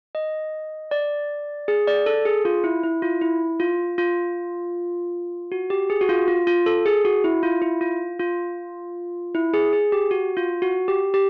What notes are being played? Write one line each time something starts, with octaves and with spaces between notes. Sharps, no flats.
D#5
D5
G#4
D5
A4
G#4
F4
E4
E4
F4
E4
F4
F4
F#4
G4
G#4
F#4
F4
F4
F4
A4
G#4
F#4
E4
F4
E4
F4
F4
E4
G#4
G#4
G4
F#4
F4
F#4
G4
G4